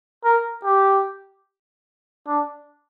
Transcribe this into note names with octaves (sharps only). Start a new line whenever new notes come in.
A#4
G4
D4